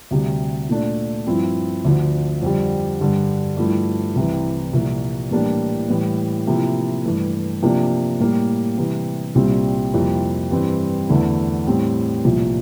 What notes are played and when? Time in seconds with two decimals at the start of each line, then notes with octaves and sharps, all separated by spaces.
0.11 D2 C3 G3
0.69 A#2 A3 D4
1.27 G2 F3 C4 E4
1.85 D2 D3 F3
2.42 F2 D3 G3
3.00 G2 D3 G3
3.57 G2 F3 A3 E4
4.16 C2 C3 E3
4.73 C2 A#2 F3 A#3
5.31 A2 E3 G3 A#3 D4
5.90 A2 E3 G3
6.47 C3 F3 A#3 E4
7.05 G2 E3 A3
7.63 C3 F3 A#3 D4
8.20 A2 G3 A#3
8.78 C3 E3 G3
9.35 C2 A#2 G3 C4
9.93 F2 C3 G3 A#3 E4
10.51 G2 E3 G3 C4
11.09 E2 D3 A3 E4
11.67 A2 G3 C4
12.25 C2 A#2 F3